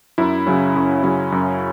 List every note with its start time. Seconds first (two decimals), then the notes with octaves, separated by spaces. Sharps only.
0.18 F#2 E4
0.46 C#3 F#3 C#4
0.76 F#2
1.04 C#3 F#3 C#4
1.32 F#2